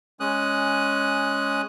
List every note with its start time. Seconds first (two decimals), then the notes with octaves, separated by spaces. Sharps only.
0.20 G#3 C#4 D#6 F#6